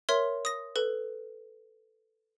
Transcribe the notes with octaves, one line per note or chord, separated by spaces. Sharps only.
A#4 C#5 E5 C6
D#6 A#6
A4 B4